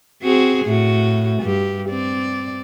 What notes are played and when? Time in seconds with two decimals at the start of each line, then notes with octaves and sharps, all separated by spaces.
0.23 C4 F#4 G#4
0.65 A2 F#4
1.42 G2 G4
1.89 C4 D5